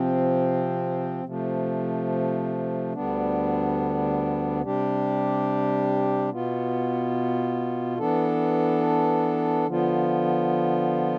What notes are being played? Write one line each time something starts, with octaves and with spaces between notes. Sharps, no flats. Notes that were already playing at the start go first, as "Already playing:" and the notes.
Already playing: C3 F3 C4
C3 F3 A3
D2 D3 G3 B3 D4
C3 G3 D4 G4
B2 B3 F4
E3 B3 D4 A4
D3 F3 B3 F4